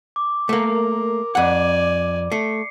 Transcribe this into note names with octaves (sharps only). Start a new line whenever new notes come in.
D6
A3 A#3 A#4
F2 D5 F#5 G#5
A3 C7 C#7